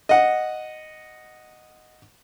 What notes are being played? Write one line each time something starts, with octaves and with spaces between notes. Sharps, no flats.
D#5 F#5